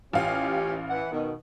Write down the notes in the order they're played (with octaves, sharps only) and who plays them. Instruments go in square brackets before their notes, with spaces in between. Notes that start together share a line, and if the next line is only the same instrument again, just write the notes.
[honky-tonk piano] A1 F5 [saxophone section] C#4 F4 G4
[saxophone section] E3 F#5
B2 D#3